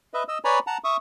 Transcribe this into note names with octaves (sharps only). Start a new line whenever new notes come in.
B4 D#5 E5
D#5 E6
B4 C#5 D5 G#5 A#5 B5
F#5 A5 A#5
E5 C#6 D#6